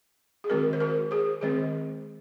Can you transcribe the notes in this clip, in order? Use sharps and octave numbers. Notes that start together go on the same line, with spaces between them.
G#4
D#3 G#3 C4 F#4 A#4
C5
F#4 A#4
G#4 C5
D#3 G#3 C4 G#4 C5